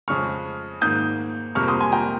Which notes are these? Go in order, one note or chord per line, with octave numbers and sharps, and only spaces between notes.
F2 C#3 G#3 C#6 F6
G#2 D#3 A#3 D#6 G6
F2 C3 G3 A#3 C#6 F6
C6 D#6
G#5 C6
G5 A#5